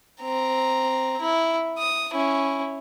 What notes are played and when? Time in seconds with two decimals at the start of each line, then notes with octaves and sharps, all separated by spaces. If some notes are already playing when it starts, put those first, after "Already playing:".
0.22 C4 A#5
1.21 E4
1.79 D#6
2.14 C#4 E4